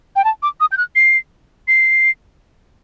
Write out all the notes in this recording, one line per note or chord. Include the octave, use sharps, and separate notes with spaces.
G5
A5
D6
D#6
G6
F#6
C7
C7